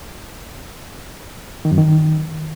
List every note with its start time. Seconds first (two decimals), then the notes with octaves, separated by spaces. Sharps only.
1.65 D#3
1.71 F#2
1.78 D#3